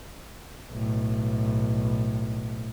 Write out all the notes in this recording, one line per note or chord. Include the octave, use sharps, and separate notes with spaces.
B1 A2